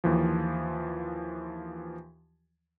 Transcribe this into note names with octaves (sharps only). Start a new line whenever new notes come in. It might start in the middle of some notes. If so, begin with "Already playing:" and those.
D#2 E3 F3